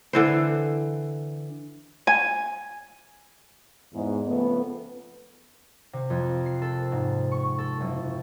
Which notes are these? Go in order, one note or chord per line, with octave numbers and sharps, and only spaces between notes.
D3 E3 C5
G#5
E2 G#2
F2 C#3 A3 B3
C3
F2
C7
A4
G#2
C#6
A4
F#1